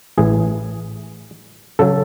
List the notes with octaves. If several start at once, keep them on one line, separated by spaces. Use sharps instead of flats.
A1 A2 E3 G#4
C#3 F#3 A4